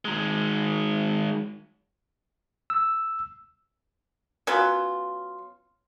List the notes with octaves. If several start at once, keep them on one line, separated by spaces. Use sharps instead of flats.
D#3 G#3
E6
F#3 B3 C#4 F4